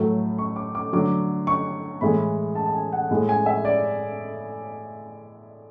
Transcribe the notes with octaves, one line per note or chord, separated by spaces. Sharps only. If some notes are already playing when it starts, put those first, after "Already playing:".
Already playing: A2 F#3 A3
C#6
D6
D6
D3 F#3 A3 D6
C#6
A2 E3 G#3 B5
A5
A5
G#5
F#5
A2 G#3
G#5
E5
D5